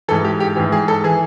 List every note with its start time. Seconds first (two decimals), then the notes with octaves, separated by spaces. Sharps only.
0.08 G#2 E3 A4
0.25 G4
0.40 G4
0.56 G#2 E3 G4
0.72 G#4
0.88 A4
1.04 E3 G#4